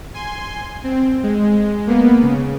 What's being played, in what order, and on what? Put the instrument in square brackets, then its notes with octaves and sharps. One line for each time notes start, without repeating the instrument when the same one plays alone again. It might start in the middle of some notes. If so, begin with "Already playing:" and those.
[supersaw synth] G#5 C6
C4
G#3
A#3 B3
C#3